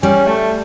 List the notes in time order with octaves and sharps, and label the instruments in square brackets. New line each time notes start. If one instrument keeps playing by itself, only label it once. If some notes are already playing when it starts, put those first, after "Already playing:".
[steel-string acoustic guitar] G3 [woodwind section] C#4
[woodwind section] A3